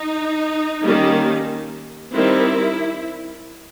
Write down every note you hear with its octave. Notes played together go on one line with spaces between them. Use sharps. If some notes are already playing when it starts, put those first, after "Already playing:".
Already playing: D#4
D#3 G3 A#3 C#4
D#3 G3 C4 E4